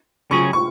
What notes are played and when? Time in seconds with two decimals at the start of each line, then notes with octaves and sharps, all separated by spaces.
0.31 C#3 F#3 C#4 G#4 C#6
0.53 C#6